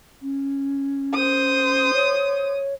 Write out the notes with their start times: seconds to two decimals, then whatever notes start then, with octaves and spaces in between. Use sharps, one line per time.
0.22 C#4
1.14 C5 D#6
1.94 C#5